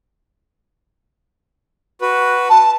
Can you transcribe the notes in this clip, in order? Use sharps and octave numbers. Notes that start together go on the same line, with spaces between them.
F#4 B4
A5